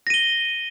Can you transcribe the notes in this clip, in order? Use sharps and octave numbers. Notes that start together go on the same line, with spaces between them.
A#6 D#7 G7